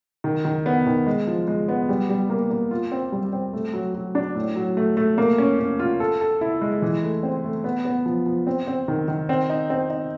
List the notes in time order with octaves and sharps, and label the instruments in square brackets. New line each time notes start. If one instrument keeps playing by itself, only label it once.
[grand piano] D#3
D#3
B3
D#3
G#3
F3
G#3
B3
G3
G3
A#3
A#3
F4
C4
G3
C4
A3
F#3
F#3
D4
A2
F#3
A3
A3
A#3
C#4
C#4
F4
A4
A4
E4
G#3
E3
A3
C4
A3
B3
B3
F3
F3
C4
C4
D#3
D#3
C4
D#4
C4
D#4